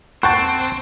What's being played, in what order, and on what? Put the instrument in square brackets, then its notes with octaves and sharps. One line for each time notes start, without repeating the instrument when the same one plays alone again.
[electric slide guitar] C4 [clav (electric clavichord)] F#5 G5 A5 [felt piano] C#6